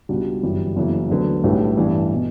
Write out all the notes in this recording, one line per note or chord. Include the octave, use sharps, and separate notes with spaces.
C#2 B2 G3 D4 F#4
G1 F#2 E3 G3
F#1 F#2 E3 B3
D2 D3 F#3 B3
B1 A2 G3 B3 D4
A1 G2 E3 B3 D4
B2